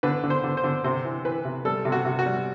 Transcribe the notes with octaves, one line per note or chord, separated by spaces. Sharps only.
D3 B4
D3
C5
D3
C5
D3
C3 C5
E3
E3 B4
C3
G3 A4
C3
F#4
C3
F#4
G3